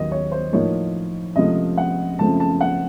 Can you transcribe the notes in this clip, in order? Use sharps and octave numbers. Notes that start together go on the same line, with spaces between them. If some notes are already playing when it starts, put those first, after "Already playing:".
Already playing: D#2 D#3 F#3 A#3 D#5
C#5
C5
A2 F3 A#3 D#4 C#5
C#2 C3 F3 A3 D#5
F#5
F#2 C#3 F3 A3 C4 A5
A5
F#5